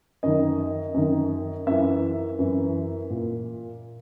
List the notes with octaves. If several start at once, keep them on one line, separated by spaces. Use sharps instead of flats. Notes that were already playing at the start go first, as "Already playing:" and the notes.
F#2 D#3 D#5
F#2 D#3
F#2 E3 E5
F#2 E3
A#2